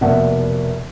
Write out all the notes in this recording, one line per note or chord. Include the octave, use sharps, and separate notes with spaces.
F1 B2 A#3 D5 E5 F#5